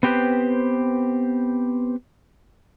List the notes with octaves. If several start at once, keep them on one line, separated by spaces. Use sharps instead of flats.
B3 C4 G4 B4 C5